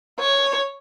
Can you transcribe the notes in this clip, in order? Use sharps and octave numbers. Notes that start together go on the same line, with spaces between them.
C#5